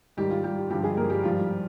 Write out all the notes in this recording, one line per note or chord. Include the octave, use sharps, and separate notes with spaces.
G#2 D#3 G3 G4
F4
G3 G4
G2 D3 F3 G3 G4
G#3 G#4
A#3 A#4
G3 G4
G#2 F3 G3 F4